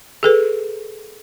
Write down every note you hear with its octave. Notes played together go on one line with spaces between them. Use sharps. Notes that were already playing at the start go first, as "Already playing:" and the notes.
G#4 A4 B4